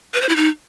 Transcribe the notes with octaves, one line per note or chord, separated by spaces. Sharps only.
B4
C5
E4
D#4